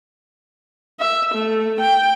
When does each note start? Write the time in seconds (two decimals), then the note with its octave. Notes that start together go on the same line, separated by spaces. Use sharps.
1.00 E5
1.34 A3
1.80 G5